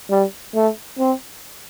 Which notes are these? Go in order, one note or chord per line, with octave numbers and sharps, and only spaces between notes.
G3
A3
C4